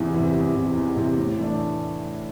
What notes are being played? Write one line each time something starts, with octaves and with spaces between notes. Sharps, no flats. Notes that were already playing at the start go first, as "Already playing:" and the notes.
Already playing: E2 C3 E3
C3 E3
E2
C3 E3
E2
C3 E3
A2
E3 A3 D4